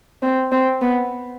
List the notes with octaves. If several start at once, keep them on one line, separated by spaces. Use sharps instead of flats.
C4
C4
B3